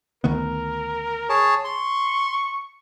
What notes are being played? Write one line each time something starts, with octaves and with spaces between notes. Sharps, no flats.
D2 D#3 B3 A#4
G#4 C#5 A5
C6 C#6